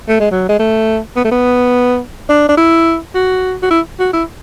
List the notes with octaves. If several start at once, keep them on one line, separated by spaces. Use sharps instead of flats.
A3
G#3
F#3
G#3
A3
B3
A3
B3
D4
D4
E4
F#4
F#4
E4
F#4
E4